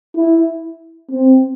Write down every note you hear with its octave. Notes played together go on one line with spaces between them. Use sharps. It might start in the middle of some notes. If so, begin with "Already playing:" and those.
E4
C4